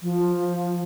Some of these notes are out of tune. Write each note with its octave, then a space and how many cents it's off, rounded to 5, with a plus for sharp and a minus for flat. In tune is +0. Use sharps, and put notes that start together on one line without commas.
F3 +10